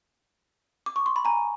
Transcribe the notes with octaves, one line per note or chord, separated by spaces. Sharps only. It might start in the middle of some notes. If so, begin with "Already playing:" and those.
D6
C#6
C6
B5
G#5 A#5